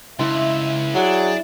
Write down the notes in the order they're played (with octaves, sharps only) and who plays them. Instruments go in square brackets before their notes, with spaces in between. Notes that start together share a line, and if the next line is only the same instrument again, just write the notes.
[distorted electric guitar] C#2 [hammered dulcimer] E4 C6 [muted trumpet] E5
[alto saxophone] F#3 [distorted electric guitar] D4 [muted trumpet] G#4